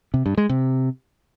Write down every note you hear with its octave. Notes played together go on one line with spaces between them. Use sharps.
C3
G2
G#3
C3